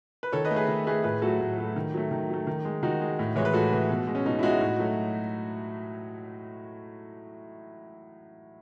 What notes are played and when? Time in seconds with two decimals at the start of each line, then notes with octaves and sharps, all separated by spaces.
0.23 B4
0.32 D#3 A4 C#5
0.45 B4 D#5
0.51 A3
0.56 G#4 B4
0.68 D#3
0.87 A3 G#4 B4
1.04 A2 G#4 B4
1.22 F#3 A3 F#4 A4
1.41 A2
1.58 F#3 A3
1.76 D#3
1.94 F#3 A3
2.11 D#3
2.30 F#3 A3
2.47 D#3
2.65 G#3
2.83 D#3 D#4 F#4
3.01 G#3
3.19 A2
3.36 E3 G#3 C#5
3.45 B4
3.54 A2 F#4 A4
3.72 E3 G#3
3.90 B2
4.07 G#3
4.15 C#4
4.26 B2 D#4
4.39 E4
4.43 G#3 D#4 F#4
4.61 A2
4.79 F#3 A3